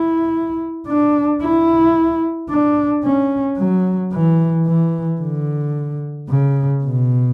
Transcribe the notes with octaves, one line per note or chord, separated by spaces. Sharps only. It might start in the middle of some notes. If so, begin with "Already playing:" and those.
Already playing: E4
D4
E4
D4
C#4
F#3
E3
E3
D3
C#3
B2